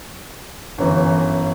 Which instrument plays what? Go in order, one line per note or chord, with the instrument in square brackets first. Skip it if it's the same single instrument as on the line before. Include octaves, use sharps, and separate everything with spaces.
[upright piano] G1 F#2 E3